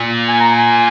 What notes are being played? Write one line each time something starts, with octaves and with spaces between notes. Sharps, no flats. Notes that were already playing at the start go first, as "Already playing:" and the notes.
Already playing: A#2
G#5
A#5
G#5